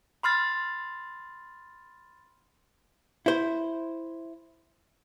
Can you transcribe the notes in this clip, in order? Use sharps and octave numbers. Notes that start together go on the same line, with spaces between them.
B5 C6 F6 A6
E4 C5